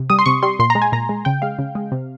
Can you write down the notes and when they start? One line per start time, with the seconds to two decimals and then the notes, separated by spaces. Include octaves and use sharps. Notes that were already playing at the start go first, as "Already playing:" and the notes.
Already playing: C3
0.10 G3 D#6
0.19 C6
0.26 C3 C#6
0.43 G3 C6
0.59 A#2 C6
0.70 A#5
0.75 G#3
0.82 G#5
0.93 A#2 A#5
1.09 G#3
1.25 C#3 G5
1.42 G#3 F5
1.59 C#3
1.75 G#3
1.92 C3